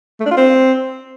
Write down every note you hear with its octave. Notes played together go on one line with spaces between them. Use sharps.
A3
D4
F4
C4